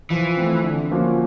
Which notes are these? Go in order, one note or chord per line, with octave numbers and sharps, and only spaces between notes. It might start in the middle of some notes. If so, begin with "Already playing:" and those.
E3 F3
A3 C4
D3
F3 A#3 C#4 F#4